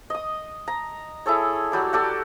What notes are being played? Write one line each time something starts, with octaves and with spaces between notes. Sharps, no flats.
D#5 D#6
A#5
E4 G#4 A4 C#5
F#3 G3 D6
F#4 G4 A4 D5